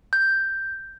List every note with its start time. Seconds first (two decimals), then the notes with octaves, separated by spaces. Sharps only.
0.13 G6